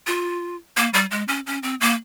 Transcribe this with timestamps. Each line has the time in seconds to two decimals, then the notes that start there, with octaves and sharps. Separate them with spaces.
0.07 F4
0.77 A#3
0.93 G3
1.11 G#3
1.28 C#4
1.46 C#4
1.63 C4
1.81 A#3